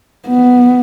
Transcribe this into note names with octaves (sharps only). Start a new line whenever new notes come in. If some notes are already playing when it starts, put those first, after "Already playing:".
B3